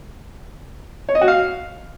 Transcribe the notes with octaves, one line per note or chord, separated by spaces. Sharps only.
C#5
D#5
F#4
F5